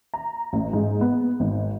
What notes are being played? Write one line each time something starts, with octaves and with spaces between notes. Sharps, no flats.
A#5
A1
G#2
B3
G#1